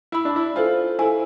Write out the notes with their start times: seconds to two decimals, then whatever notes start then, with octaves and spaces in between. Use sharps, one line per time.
0.12 E4 E5 B5 E6
0.25 D4
0.36 E4
0.56 F4 A4 C5 G#5
0.99 E4 A4 C5 G#5